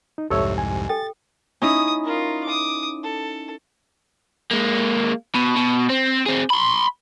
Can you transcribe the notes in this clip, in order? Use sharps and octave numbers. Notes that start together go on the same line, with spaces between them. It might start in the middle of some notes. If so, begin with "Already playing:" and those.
D#4
C2 F2 G#2 G4 A4 C#5 E5 E6
G#5
A4 G5 A6
C#4 D#4 E4 D#6
F4 A#4
D6 D#6
A4
G#3 A#3
B2
B2
C4
C4 G#4
B5 C6